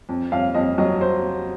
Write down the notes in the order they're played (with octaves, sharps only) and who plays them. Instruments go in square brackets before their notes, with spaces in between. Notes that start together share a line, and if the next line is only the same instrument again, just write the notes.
[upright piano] F2
F2 F5
F2 D#5
F#3 D#5
C5